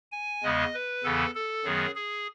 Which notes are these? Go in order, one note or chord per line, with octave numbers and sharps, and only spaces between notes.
G#5
E2 C#3 G#3 B3 D#5
B4
E2 C#3 E3 B3 A4
A4
F#2 D#3 F#3 B3 G#4
G#4